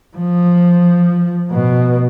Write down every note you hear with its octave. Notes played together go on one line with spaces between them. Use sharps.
F3
B2